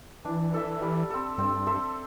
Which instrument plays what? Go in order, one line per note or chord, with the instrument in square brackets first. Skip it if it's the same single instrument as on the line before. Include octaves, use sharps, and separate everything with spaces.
[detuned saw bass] E3 [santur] D4
[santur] A4 E5
G3
C4 A4
[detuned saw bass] G2 [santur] C4
[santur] A4 C5 E5